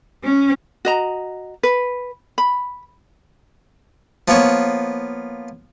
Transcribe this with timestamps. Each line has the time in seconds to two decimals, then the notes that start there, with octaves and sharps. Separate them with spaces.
0.23 C#4
0.85 F#4 D#5 A#5
1.63 B4
2.38 B5
4.28 F3 A#3 B3 C#5